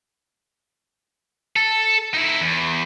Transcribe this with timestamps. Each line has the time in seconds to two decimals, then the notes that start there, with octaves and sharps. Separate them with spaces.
1.56 A4
2.14 D#4 E4
2.41 E2